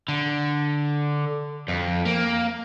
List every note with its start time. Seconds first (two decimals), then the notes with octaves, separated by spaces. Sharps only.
0.09 D3
1.68 F2
2.05 A#3